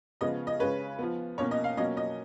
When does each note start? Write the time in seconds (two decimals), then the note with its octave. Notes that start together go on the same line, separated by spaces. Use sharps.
0.21 C#3 F3 G#3 B3 D#5
0.47 D#5
0.59 C#3 G#3 C#4 B4
0.99 F3 B3
1.38 B2 A#3 C#4 C#5
1.51 D#5
1.64 F5
1.77 B2 F#3 A#3 C#4 D#5
1.97 D#5